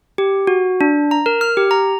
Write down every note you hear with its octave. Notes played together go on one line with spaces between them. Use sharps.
G4
F#4
D4
A#5
A#4
F6
G4
A#5